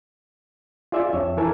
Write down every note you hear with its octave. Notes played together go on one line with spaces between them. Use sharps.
F4 G#4 D5 E5 F5
F2 C#5 E5
E3 A4 A#4 G#5 A5